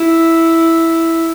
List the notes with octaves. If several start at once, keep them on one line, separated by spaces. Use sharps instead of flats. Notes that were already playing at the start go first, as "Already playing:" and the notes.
Already playing: E4